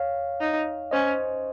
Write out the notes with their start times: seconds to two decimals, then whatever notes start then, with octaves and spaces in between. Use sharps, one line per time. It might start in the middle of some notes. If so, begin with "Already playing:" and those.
Already playing: C#5 F5
0.40 D#4
0.91 C#4 C5 D#5